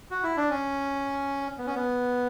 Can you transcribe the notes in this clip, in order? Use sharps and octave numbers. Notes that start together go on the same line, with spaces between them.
F#4
E4
D4
C#4
B3
C#4
B3